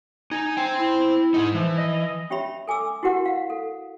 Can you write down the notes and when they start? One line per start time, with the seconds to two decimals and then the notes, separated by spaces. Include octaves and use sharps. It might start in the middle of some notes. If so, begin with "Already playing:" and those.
0.31 D#4 G#5
0.57 C5 G5
0.79 E4
1.34 G#2 D#4
1.54 E3 F3
1.78 D#5
2.30 C#4 G4 C#5 E5 B5
2.68 A4 G#5 D6 E6
3.03 E4 F#4 G4 A#4 F#5
3.26 F5 F#5
3.50 A4